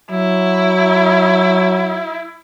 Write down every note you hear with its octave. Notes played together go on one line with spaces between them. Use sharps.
F#3 E4